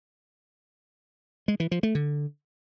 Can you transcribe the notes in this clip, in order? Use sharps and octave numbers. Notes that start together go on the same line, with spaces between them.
G#3
E3
F3
A3
D3